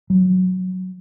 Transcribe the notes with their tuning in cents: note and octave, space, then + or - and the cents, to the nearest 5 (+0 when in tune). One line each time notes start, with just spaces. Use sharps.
F#3 +0